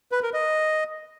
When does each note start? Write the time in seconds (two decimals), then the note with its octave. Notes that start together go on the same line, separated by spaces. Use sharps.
0.12 B4
0.23 A#4
0.34 D#5